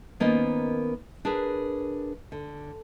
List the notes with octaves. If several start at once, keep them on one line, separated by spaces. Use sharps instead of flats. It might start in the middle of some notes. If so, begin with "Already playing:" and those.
D#3 A#3 B3 C#4 C5 D#5
D4 G#4 A#4 B4
D3